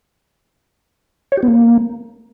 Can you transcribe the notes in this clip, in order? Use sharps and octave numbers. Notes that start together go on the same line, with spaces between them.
C#5
G4
B3
A#3